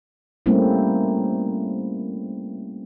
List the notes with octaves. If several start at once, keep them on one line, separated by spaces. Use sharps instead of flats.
G3 A3 A#3 C4 C#4 E4